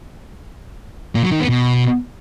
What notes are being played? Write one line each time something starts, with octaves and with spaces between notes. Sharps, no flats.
A#2
F#3
D#3
B3
B2